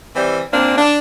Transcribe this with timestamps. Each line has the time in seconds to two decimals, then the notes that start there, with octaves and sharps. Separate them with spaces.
0.16 E3 G3 C4
0.52 A#2 A#3 C4 D4
0.76 D4